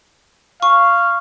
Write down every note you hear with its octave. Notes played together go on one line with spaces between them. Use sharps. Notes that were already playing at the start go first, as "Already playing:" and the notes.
F5 C#6